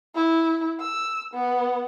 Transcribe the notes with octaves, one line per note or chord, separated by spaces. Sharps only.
E4
E6
B3